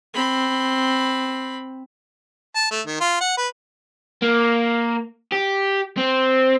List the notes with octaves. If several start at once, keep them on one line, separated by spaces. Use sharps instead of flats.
C4 B5
A5
A3
D#3
F4
F#5
B4
A#3
G4
C4